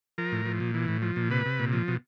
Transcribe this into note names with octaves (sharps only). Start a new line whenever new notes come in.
F3 A#4
A2
F3
A#2
E3
A2
F3
A#2
C3 B4
C3
A#2
F3
B2